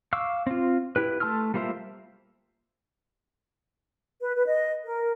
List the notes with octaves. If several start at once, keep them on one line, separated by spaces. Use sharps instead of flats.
F5 C#6 D6 E6
C4 F4
E4 G4 B4
A3 A5 C6 E6 F6
G3 A#3 F4 C5 E5
B4
B4
D#5
A#4